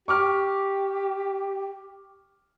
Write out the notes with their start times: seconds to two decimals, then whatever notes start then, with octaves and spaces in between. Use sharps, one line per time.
0.08 G4 C#6 D6 F6